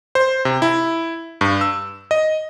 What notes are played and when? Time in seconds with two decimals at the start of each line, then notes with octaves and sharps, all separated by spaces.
0.15 C5
0.45 C3
0.62 E4
1.41 G2
1.61 E6
2.11 D#5